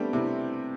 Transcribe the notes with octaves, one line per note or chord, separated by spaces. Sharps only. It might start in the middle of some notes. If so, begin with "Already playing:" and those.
Already playing: G3 A3 B3 C4 D4 G4
C3 C4 E4